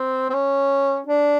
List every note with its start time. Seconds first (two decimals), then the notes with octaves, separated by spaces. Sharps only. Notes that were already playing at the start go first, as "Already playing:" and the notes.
Already playing: C4
0.30 C4
0.34 C#4
1.07 D4